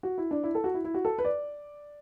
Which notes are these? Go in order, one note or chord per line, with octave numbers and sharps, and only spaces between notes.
F#4
E4
D4
E4
A4
F#4
E4
E4
F#4
A4
B4
D5